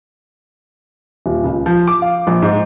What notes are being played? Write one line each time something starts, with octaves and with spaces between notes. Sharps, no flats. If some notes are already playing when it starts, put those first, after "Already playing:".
D#1
C#2
F3
D6
F5
A#1
G#2